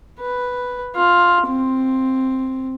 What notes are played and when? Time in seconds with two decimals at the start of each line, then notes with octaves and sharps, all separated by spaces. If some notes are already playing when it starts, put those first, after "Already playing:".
0.21 B4
0.96 F4
1.48 C4